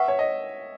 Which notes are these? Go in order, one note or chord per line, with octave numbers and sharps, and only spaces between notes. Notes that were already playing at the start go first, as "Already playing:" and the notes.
Already playing: B4 E5 F#5 C#6
C#5
D#5